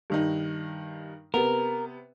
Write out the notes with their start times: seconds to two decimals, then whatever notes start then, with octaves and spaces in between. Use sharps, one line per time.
0.10 G2 D#3 D#4
1.34 C3 B3 A#4